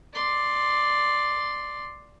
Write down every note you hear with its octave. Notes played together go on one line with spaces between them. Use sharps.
D5 C6